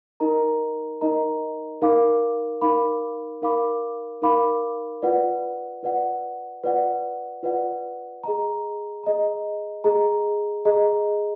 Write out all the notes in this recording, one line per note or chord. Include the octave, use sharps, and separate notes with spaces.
D#4 A#4 D#5 A#5
D#4 A#4 D#5 A#5
D#4 A#4 F5 B5 D6
D#4 A#4 F5 B5 D6
D#4 A#4 F5 B5 D6
D#4 A#4 F5 B5 D6
F4 B4 D5 F#5
F4 B4 D5 F#5
F4 B4 D5 F#5
F4 B4 D5 F#5
G#4 D#5 A#5
G#4 D#5 A#5
G#4 D#5 A#5
G#4 D#5 A#5